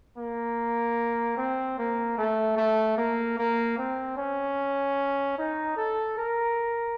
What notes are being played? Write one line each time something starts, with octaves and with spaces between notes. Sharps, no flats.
A#3
C4
A#3
A3
A3
A#3
A#3
C4
C#4
D#4
A4
A#4